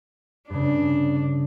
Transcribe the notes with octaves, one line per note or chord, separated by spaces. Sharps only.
G2 C#3 D4